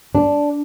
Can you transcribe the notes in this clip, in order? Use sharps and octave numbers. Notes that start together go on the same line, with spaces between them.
D4